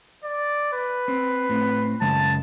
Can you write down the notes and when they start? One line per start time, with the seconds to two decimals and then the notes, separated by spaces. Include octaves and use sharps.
0.24 D5
0.73 B4
1.08 C4
1.49 A2 C4
2.01 F#2 C#3 G#3 A5